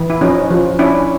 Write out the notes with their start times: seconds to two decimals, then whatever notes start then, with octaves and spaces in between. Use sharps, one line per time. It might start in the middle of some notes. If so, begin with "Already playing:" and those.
Already playing: E3
0.10 E4
0.21 F3 C#4 D#4
0.50 F3
0.79 C#4 D4 E4